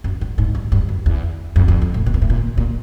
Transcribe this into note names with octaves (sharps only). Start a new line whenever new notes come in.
F#2
G2
G#2
G2
G2
F#2
E2
F2
F2
F2
A2
B2
A#2
A2
A#2
A#2